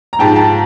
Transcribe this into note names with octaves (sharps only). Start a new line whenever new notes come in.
A#5
G#2 F3 G5 A5
G5 A5